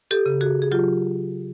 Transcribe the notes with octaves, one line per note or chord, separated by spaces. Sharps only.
G4 A4
C#3
F#4 G#4
G#4
F#3 F4 G4